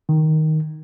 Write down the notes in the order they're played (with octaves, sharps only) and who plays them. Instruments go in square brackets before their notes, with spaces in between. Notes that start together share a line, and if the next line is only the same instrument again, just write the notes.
[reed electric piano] D#3